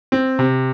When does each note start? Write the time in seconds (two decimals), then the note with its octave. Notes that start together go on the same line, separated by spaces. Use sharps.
0.12 C4
0.39 C3